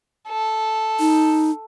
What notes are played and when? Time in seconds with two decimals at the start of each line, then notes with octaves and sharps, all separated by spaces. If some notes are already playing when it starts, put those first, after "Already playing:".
0.28 A4
0.99 D#4